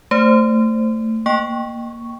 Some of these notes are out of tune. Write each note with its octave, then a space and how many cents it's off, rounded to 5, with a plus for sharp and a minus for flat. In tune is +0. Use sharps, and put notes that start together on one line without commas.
A3 +20 C5 +0
A#3 +5 G5 +0 C#6 +0